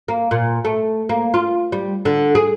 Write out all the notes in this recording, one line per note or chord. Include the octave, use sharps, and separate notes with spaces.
A#3
A#2
A3
A#3
F4
G3
D3
G#4